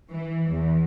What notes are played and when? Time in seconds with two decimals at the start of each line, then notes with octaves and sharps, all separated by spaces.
0.11 E3
0.50 E2